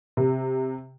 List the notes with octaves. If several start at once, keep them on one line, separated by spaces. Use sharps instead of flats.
C3